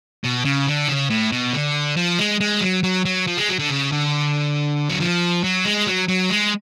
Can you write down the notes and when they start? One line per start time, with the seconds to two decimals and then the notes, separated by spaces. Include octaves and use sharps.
0.24 B2
0.45 C#3
0.67 D3
0.89 C#3
1.10 A2
1.32 B2
1.53 D3
1.97 F3
2.19 G#3
2.40 G#3
2.61 F#3
2.83 F#3
3.05 F#3
3.27 F3
3.38 G#3
3.49 F#3
3.59 D3
3.70 C#3
3.92 D3
4.89 F#3
5.00 F3
5.44 F#3
5.65 G#3
5.87 F#3
6.08 F#3
6.30 G#3